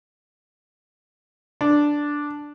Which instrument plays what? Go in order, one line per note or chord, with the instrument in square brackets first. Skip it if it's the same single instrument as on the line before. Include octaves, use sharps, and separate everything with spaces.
[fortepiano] D4